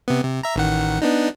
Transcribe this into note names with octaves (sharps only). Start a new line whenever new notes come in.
C3 B3
C3
E5 A#5
A1 D#3 F#5
B3 D4 D#4